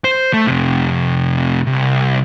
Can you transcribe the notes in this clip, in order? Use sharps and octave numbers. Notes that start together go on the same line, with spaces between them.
C5
A3
F2 C3
C2